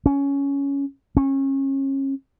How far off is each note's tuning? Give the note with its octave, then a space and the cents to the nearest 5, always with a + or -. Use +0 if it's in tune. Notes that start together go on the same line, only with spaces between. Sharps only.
C#4 +10
C#4 -30